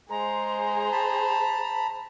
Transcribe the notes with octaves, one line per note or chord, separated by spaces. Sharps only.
G#3 G#4 C5 A#5
A5 B5